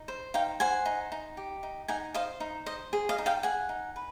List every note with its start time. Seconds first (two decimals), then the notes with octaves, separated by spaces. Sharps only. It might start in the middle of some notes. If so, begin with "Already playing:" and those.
Already playing: D#4
0.08 C5
0.34 D#4 F5 G5
0.60 C5 F#5 G#5
0.86 D#4
1.12 D#4
1.37 G4
1.63 D#4
1.88 D#4 F#5 G#5
2.14 C5 D#5 F5
2.40 D#4
2.66 C5 D#5
2.93 G#4
3.09 D#5 F5
3.18 D#4
3.26 F5 G5
3.43 G#4 F#5 G#5
3.69 D#4
3.96 B4